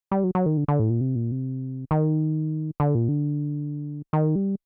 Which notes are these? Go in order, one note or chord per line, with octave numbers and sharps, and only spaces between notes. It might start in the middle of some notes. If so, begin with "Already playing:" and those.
G3
F#3
F#3
D#3
D3
D3
A2
A#2
C3
A#2
C3
D#3
D3
A#2
D3
D#3
G3